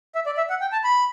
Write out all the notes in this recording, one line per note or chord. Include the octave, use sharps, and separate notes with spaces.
E5
D5
E5
F#5
G5
A5
B5